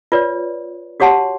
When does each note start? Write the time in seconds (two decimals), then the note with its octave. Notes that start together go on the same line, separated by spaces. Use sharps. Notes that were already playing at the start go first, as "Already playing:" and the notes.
0.12 F4 B4 C#5 D5
1.00 F#4 G4 C#5 F#5 A5 C6